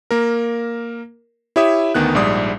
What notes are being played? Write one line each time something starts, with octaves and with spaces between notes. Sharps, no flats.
A#3 A#4
E4 G4 C#5 E5 D#6
D2 D#3 B3 F#6
A#1 G#2 G3 D5 D#6